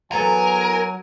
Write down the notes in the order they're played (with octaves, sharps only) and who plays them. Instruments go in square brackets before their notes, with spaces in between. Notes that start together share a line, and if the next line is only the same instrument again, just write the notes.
[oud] E3 B3 A4 [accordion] F#3 [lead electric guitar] A#4 [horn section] G#5